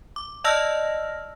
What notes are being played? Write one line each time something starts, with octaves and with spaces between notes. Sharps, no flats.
D6
D5 D#5 A5 E6 F6 A#6